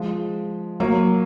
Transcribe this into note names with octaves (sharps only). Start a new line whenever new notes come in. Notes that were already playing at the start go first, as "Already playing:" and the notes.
Already playing: F3 G#3
F#3 A#3